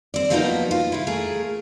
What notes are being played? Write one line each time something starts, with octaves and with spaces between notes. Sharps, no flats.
C4 D5
F3 F#3 A#3 B3 D4 D#4
F4
C#3 E4
A3 G#4 A#4